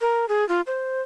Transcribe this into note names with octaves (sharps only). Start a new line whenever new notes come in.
A#4
G#4
F4
C5